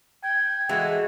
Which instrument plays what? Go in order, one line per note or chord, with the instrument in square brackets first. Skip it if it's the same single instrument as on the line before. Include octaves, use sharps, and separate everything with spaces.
[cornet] G5 [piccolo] G#6
[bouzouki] E3 [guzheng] G#3 G#4 A4 [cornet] F#4